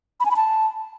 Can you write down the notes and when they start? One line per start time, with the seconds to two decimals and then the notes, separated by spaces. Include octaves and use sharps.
0.20 B5
0.25 G#5
0.31 B5
0.36 A5